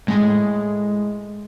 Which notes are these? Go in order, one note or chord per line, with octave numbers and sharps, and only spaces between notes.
A2 G#3